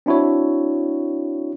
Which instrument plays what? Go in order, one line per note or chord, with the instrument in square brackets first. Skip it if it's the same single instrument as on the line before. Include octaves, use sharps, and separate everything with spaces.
[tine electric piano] C4 D4 E4 F#4 C#5